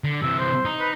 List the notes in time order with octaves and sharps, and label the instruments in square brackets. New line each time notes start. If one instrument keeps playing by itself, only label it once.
[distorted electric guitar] D3
[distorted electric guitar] C3 E3 [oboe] E6
[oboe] C5
[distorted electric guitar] D#4
[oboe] B4